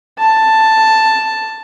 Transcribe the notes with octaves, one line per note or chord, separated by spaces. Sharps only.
A5